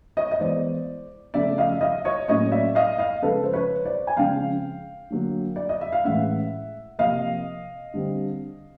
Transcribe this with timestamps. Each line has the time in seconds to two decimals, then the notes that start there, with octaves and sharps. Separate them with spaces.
0.17 C#5 D#5
0.31 D#5
0.40 E3 G#3 B3 C5 D5
1.34 C#3 F3 A3 D5 E5
1.58 D#5 F5
1.72 E5
1.81 D#5 F5
2.05 C#5 D#5
2.28 A2 F#3 A#3 C#4 C#5 D#5
2.51 D5 E5
2.75 D#5 F5
2.98 D#5 F5
3.22 C#3 F3 G#3 A4 B4
3.43 C5
3.53 B4 C#5
3.85 C5 D5
4.07 G#5
4.17 C#3 F3 G#3 C4 F5 G5
5.10 D3 F#3 A#3
5.56 D5
5.69 D#5
5.81 E5
5.92 F5
6.04 A2 E3 G#3 C#4 E5 F#5
6.98 C3 F3 A#3 D#5 F5
7.94 D3 G3 C4